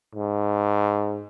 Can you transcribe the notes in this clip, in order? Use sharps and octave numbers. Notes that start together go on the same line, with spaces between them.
G#2